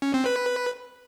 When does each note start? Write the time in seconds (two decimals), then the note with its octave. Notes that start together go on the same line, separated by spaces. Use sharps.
0.02 C#4
0.14 C4
0.26 B4